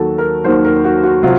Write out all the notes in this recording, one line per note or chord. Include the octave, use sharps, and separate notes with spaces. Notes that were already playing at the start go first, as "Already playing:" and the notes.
Already playing: D#2 D#3 F#3 F#4 A4
A#4
D#2 D#3 F#3 C5
A#4
F#4
F#4
C3 F#3 F4